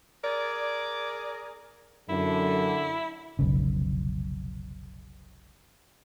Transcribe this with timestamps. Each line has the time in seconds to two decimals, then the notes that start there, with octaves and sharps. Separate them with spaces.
0.23 G#4 A#4 D5
2.09 F#2 D3 E4
3.39 F1 B1 C#3